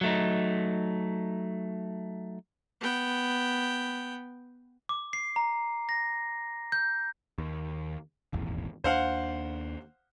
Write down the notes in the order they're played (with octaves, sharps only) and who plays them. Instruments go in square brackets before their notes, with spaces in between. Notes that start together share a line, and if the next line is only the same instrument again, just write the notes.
[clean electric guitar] F#3 A3 D#4
[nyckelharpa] B3 G5
[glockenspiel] D6
C7
A#5
A#6
G6
[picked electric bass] D#2
D#1 G#1 E2
[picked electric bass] D#2 D4 [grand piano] C5 F5 F#5